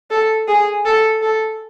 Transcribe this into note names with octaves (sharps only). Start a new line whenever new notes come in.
A4
G#4
A4
A4